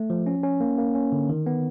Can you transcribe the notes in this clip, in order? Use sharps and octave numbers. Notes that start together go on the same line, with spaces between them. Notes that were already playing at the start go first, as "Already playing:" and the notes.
Already playing: A3
F3
C#4
C#4
A#3
A#3
C#4
D3
D#3
B3